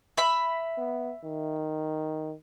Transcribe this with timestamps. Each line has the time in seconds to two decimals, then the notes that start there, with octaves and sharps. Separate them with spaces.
0.17 E5 B5
0.78 B3
1.23 D#3